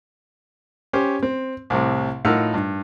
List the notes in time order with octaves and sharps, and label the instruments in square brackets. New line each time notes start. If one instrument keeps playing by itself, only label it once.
[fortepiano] C#4 G4 C5
C4
C2 A2 C3
A2 D#4 F4 A#4 F#5 E6
G2